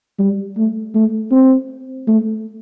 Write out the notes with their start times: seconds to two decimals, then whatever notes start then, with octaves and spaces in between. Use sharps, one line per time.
0.19 G3
0.57 A3
0.95 A3
1.32 C4
2.07 A3